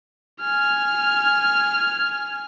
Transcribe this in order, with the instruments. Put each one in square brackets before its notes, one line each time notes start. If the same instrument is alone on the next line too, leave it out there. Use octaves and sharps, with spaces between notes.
[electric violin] G#5 F6